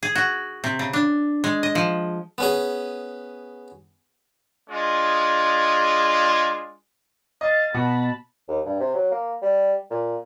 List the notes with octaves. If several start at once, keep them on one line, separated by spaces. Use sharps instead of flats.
G#4
F#4
C3
C#3
D4
G#3
D#5
F3
B3 C#4 G#4
G#3 D4 F4 G#4
D#5 F5 A6
B2 B3 F#4 A5 B5
D#2
G2
C3
F#3
A#3
G3
A#2